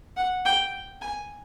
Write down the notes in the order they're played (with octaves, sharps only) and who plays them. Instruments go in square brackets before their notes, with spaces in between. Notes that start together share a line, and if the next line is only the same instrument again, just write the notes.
[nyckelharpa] F#5
G5
G#5